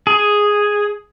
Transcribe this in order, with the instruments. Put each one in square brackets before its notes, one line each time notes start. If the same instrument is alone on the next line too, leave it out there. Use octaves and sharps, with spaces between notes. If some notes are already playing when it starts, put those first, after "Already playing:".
[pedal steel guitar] G#4